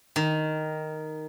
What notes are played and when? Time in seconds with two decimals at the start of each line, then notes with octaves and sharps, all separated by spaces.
0.16 D#3